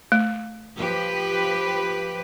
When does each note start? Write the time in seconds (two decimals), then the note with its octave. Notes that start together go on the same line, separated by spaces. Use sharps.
0.12 A3
0.77 F3 G4 B4